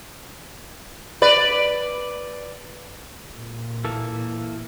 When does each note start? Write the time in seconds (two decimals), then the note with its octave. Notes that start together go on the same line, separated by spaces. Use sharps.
1.22 B4 D5
3.29 A#2
3.85 E3 A#3 A4